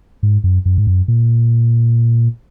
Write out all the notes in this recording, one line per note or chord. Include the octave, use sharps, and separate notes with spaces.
G#2
F#2
F#2
G#2
F#2
A#2